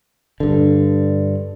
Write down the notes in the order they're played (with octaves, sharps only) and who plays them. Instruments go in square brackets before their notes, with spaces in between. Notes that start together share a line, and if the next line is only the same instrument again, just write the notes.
[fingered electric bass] G2 D3